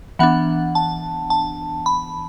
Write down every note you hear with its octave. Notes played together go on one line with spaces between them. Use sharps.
E3 B3 D4 F#5
A5
A5
B5